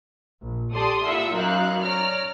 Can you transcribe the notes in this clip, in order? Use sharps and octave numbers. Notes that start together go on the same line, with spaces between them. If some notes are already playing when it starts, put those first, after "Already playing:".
A#1
G4 A4 D5 A5 C6 D#6
A#2 E4 E5 F#5 E6
F#2 D#4 A#4 F5 F#6
C#5 D5 A#5 F6